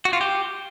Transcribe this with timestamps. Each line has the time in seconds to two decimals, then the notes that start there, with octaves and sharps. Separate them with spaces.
0.05 F#4
0.13 F4
0.21 G4